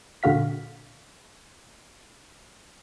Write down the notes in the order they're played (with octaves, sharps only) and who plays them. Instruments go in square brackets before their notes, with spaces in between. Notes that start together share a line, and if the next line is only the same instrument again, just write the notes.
[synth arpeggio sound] A#2 D3 F#4 F5 B6